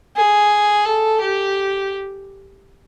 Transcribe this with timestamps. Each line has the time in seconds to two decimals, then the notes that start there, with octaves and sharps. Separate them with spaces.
0.16 G#4
0.85 A4
1.21 G4